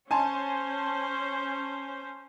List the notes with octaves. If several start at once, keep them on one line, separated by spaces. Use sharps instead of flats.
C#4 C5 G#5 A5 C6